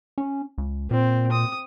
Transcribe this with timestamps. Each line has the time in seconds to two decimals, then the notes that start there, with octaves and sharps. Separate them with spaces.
0.18 C#4
0.58 C#2
0.91 A#2 C4
1.32 D#6